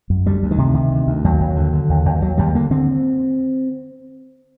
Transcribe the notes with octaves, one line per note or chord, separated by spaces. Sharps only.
F#2
D2 G3
D2
D#3
C3
C3
D2
D2
D#2 F#3
D#2
D3
D3
D#2
D#2
D#2 F#3
D#2 G3
D3 A#3
D3 C4